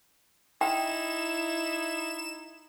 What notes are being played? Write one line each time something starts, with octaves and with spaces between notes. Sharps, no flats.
D#4 E4 G5 E7